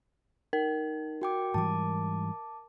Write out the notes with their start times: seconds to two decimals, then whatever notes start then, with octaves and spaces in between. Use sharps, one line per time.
0.53 D#4 A#4
1.22 F#4 G5 D6
1.54 G#2 E3 G3 A5 D6